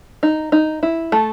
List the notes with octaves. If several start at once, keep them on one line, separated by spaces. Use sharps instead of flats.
D#4
D#4
E4
A3 A4